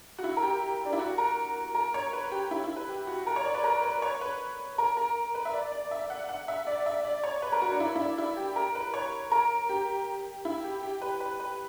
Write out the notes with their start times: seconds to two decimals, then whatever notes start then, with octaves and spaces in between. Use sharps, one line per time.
0.18 F#4
0.24 E4
0.37 A#4
0.43 G4
0.85 D4
0.93 E4
0.99 F#4
1.18 A#4
1.75 A#4
1.94 C#5
2.13 B4
2.32 G4
2.51 E4
2.64 E4
2.76 B4
2.89 G4
3.07 F#4
3.27 A#4
3.36 C#5
3.45 D5
3.54 B4
3.64 A#4
3.83 B4
4.02 C#5
4.21 B4
4.78 A#4
4.97 A#4
5.35 B4
5.45 E5
5.53 D5
5.72 D5
5.91 E5
6.10 F#5
6.29 F#5
6.48 E5
6.67 D5
6.86 E5
7.05 D5
7.24 C#5
7.42 B4
7.52 A#4
7.62 F#4
7.71 D4
7.80 E4
7.96 E4
7.99 D4
8.18 E4
8.37 G4
8.56 A#4
8.75 B4
8.94 C#5
9.32 A#4
9.69 G4
10.45 E4
10.64 G4
10.83 G4
11.01 B4
11.20 B4
11.40 B4